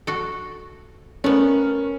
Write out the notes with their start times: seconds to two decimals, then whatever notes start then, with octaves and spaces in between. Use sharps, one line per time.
0.07 F#4 A4
1.24 A3 B3 C#4 A#4